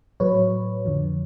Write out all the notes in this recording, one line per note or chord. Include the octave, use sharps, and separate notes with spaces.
A2 F#3 B4 C#5
F2 D3 F3